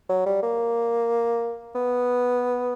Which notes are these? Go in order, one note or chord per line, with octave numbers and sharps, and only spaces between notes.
F#3
G3
A#3
B3